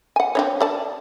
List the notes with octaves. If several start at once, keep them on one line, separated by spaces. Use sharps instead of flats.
F#5 G#5
C4 D4 C#5
A4 D5 A5